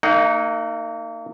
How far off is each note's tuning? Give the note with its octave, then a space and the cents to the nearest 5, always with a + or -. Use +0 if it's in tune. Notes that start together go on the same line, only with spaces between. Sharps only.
A#3 -35 D#4 +0 F#5 +30